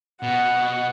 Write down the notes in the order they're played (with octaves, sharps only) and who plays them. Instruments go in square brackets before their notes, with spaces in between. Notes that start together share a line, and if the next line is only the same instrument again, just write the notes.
[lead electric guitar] B2 [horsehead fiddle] F#5